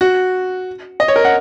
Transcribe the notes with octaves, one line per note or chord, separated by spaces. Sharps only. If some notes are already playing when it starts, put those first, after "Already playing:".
F#4
D#5
C#5
A#4
F#5